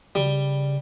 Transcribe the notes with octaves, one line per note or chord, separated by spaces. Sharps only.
C#3 G3